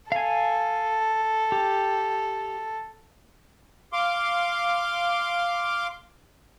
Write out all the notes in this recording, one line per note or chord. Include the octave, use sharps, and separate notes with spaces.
A4 F5 G#5
G4
F5 C6 D6